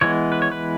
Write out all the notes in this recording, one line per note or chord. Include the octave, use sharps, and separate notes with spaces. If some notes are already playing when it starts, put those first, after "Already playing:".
E3 G#3 B3 C#5
B4
C#5
B4